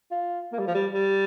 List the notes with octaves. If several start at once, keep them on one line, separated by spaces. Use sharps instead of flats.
F4
A#3
G3
F3
G3
G3